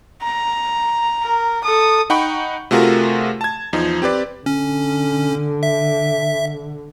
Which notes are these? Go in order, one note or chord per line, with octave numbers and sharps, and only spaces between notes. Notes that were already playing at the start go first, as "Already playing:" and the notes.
A#5
A#4
A4 D#6
D#4 F#5 G5 B5 C#6
C3 A3 F4 F#4 G#4 A#4
A5 G#6
E2 F3 D#4
C4 G4 B4 D5
D3 C#4
E5